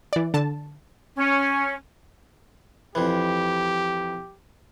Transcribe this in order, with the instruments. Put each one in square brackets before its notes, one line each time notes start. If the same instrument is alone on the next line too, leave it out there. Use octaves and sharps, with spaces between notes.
[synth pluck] E3 D5
D3 A5
[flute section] C#4
[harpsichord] F2 E3 [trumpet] G4